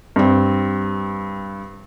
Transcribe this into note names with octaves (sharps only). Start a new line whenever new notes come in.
G2 C4